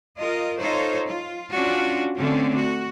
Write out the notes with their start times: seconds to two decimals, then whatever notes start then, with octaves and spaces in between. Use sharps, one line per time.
0.17 F4 A#4 D#5
0.59 D#4 F4 A4 C5 C#5
1.05 F4
1.52 C#4 D4 F4 F#4
2.17 D3 A3 C4 C#4
2.56 F#4